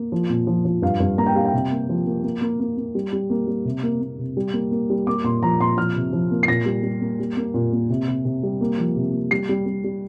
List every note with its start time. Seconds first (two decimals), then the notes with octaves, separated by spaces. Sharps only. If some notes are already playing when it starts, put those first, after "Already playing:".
Already playing: A#3
0.12 F3
0.29 A#2
0.47 F3
0.65 F3
0.82 G2 F5
1.00 G2
1.17 A#3 A#5
1.26 G5
1.35 G3 F5
1.45 G5
1.53 C3
1.72 A#3
1.89 F3
2.07 A#3
2.23 A#3
2.41 A#3
2.60 A#3
2.77 A#3
2.95 G3
3.13 G3
3.30 A#3
3.47 G3
3.65 C3
3.83 A#3
4.01 A#3
4.19 C3
4.37 G3
4.53 A#3
4.71 A#3
4.90 G3
5.07 A#3 D6
5.24 A#2 C6
5.42 F3 A#5
5.60 A#2 C6
5.77 F3 F6
5.96 C3
6.13 F3
6.31 A#3
6.43 C7
6.48 A#2 A#6
6.66 G3
6.83 G3
7.01 A#3
7.20 G3
7.37 A#3
7.54 A#2
7.72 A#3
7.90 C3
8.08 C3
8.25 C3
8.43 G3
8.61 A#3
8.78 F3
8.96 C3
9.13 A#3
9.31 G3 C7
9.49 G3
9.66 G3
9.84 G3